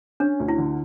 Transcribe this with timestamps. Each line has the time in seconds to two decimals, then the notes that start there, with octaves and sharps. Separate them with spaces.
0.20 C#4 D4
0.40 D2
0.48 E4
0.58 D3